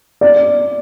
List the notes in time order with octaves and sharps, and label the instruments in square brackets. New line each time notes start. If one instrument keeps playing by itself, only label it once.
[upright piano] D5